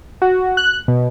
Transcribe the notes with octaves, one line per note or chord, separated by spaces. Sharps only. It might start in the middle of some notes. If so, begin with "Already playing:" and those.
F#4
F#6
B2